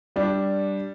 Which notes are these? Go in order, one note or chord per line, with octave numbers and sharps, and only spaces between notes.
G3 D4